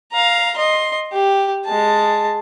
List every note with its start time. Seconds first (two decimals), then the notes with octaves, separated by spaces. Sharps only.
0.12 F5 A#5
0.56 D#5 C6
1.13 G4
1.65 G#3 A5